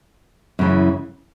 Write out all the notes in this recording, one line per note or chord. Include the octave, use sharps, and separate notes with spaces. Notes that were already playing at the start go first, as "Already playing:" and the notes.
F#2 C#3 E3